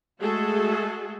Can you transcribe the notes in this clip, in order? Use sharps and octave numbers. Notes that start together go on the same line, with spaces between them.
G#3 A3 F#4 G#4 A4